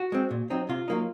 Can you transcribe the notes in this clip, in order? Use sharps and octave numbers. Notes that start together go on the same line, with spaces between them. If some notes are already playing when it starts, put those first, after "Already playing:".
Already playing: F#4
G#3 C4
A#2
F#3 C4 D#4
C3 F4
F#3 A#3 D#4